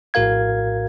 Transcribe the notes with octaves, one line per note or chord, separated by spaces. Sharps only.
A#1 A2 F#4 A#4 F5 G#6